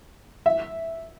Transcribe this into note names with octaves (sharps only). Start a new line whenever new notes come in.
E5